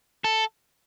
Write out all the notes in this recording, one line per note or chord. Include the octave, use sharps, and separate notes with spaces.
A4